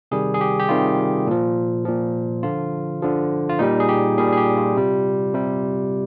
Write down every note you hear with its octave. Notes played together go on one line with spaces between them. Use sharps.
C3 D#3 G3 G#4
G#4
G4
G4
C3 D#3 G3 F4
A#2 F3
A#2 F3
D3 F3 F4
D3 F3
F4
A#2 G3 D#4
G#4
G4
A#2 G3 G#4
G#4
G4
F4
C3 G3
C3 G3